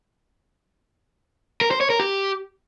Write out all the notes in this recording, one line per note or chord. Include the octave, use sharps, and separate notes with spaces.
A#4
C5
C#5
A#4
G4